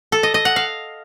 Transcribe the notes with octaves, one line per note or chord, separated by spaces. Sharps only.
A4
D#5
D#5
F#5
F5